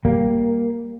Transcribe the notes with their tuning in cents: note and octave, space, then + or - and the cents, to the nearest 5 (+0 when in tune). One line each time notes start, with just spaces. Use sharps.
G3 +0 A#3 +0